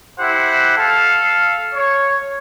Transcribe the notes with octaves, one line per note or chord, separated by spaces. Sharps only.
E4 G4 C5 F#5
A4 F5
C#5